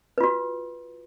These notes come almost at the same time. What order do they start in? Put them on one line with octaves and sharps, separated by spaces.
B4 F4 F#4